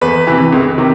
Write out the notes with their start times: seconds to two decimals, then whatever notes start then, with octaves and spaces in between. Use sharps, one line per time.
0.01 E2 B4
0.27 C3 E3
0.53 C#2
0.78 C3 D#3